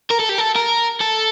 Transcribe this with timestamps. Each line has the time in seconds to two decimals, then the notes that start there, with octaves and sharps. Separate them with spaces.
0.10 A#4
0.19 A4
0.29 G4
0.38 A4
0.56 A#4
1.01 A4